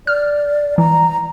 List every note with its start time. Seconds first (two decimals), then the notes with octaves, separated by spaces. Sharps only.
0.07 D5 F6
0.78 E3 A#5